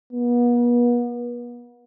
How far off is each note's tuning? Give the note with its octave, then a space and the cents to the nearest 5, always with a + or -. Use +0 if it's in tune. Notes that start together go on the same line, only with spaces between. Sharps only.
B3 -40